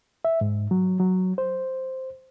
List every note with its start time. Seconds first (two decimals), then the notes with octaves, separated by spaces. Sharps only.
0.25 E5
0.41 G#2
0.71 F#3
0.99 F#3
1.38 C5